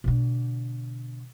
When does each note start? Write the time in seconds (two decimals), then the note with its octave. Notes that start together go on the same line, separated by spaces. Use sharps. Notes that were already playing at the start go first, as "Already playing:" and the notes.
0.04 B2 D3